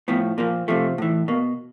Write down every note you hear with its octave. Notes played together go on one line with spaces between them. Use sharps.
A2 F3 B3
A#2 F3 A#3
C3 F3 A3
A2 E3
B2 A#3